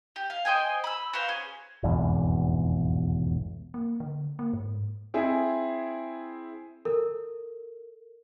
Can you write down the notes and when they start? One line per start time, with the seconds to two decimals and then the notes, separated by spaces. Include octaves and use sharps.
0.16 G4
0.30 F5
0.45 C5 D#5 G5 G#5
0.84 B5 E6
1.13 F#4 B4 C5 F5
1.28 C#4 G#4
1.83 F1 B1 E2 G#2
3.74 A#3
4.00 D3
4.39 A#3
4.53 G#2
5.14 C4 E4 G#4
6.85 A4 A#4